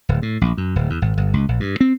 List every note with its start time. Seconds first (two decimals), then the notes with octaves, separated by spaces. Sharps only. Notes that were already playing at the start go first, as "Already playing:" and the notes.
0.09 D1
0.22 A2
0.41 A#1
0.57 F#2
0.76 D1
0.90 E2
1.02 G#1
1.17 G1
1.34 C#2
1.49 A#1
1.60 G2
1.80 C4